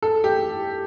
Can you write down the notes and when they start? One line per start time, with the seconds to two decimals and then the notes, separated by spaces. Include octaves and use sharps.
0.02 A4
0.24 G4